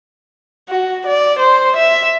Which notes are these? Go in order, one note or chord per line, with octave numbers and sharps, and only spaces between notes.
F#4
D5
C5
E5